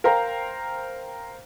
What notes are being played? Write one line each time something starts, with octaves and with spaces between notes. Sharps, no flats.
A#4 C5 F5 G5 A#5